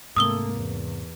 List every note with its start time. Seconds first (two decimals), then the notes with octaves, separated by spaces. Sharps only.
0.16 G#2 C3 A3 A#3 D#6 E6 G7
0.54 E2